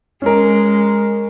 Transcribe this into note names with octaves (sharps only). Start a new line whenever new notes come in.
G#3 C#4 A#4